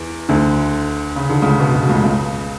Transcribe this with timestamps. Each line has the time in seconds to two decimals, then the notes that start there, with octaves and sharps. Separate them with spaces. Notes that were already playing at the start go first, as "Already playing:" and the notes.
Already playing: E2 E3
0.29 D2 D3
1.16 C#3
1.30 D3
1.42 C#2 C#3
1.60 B2
1.75 B2
1.89 C#2 C#3
2.04 C#2 C#3